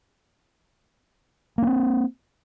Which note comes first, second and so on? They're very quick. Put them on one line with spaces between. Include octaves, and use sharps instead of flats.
A#3 C#4 C4